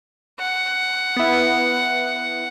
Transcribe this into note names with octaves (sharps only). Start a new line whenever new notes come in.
F#5
B3 E4